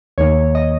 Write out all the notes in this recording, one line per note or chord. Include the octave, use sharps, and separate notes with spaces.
D#2 D#3 A#3 C#5
D#5